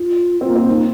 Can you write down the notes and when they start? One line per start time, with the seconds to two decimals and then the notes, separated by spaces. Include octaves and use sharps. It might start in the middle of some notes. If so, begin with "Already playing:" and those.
Already playing: F4
0.41 C4
0.48 A#3
0.56 C4
0.68 A#3 D#4